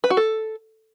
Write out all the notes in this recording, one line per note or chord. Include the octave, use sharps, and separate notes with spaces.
B4
F#4
A4